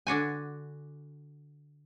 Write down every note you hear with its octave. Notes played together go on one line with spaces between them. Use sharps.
D3 D4 F#4 G#5